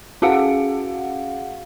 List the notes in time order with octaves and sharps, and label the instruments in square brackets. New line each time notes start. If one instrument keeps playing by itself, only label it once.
[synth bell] C#4 F#4 G#4 F5 F#5